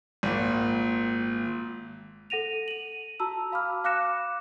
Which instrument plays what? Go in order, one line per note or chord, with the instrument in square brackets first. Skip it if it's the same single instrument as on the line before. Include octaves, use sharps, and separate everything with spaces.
[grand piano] G#1 A#2
[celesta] A4 F#5 A#6 D#7 F7
D#7 F#7
F#4 A5 A#5 E6
F5 B5 D6 F6
F5 D6 F#6 A#6 C#7 E7